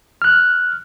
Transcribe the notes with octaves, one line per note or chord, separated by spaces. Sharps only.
F6 F#6